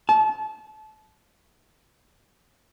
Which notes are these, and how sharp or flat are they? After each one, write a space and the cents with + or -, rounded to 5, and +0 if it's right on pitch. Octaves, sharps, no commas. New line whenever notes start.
A5 -25